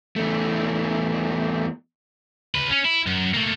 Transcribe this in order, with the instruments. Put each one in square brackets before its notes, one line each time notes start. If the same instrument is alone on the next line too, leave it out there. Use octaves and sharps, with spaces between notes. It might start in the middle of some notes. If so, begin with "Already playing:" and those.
[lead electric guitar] E2 A3
[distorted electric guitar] C#2 B4
C#4
E4
F#2
A3 A#3